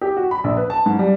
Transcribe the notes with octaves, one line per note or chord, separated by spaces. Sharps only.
G4
F#4
B5
A#1
B4
A5
G#2
G3